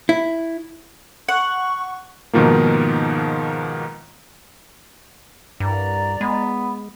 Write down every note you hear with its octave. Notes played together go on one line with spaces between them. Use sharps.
E4
F#5 C#6
G#2 B2 D#3 F3 A#3
C2 G2 D5 A#5
G#3 B3